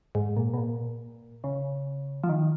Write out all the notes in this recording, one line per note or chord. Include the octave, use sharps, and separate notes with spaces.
G#2
A#2
B2
A#2
C#3
F3
D#3